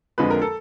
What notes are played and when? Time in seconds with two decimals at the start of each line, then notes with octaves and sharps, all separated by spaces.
0.18 F2 D3 F3 G#3 B4
0.31 A#4
0.42 A4